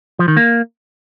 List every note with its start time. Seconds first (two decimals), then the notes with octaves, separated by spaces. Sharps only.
0.19 F3
0.28 D#3
0.37 A#3